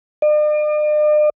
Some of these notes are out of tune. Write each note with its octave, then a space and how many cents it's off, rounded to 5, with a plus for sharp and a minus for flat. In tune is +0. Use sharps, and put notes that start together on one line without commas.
D5 +45